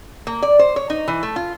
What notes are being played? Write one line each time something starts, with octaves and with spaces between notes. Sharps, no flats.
A#3
D5
C5
C#5
D#4
E3
A3
F4